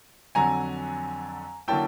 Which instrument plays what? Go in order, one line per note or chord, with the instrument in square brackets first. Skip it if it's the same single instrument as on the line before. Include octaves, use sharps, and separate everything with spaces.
[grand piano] F2 D3 F#3 G#5 A#5
D3 F#3 A#3 C#4 E4 G5 A5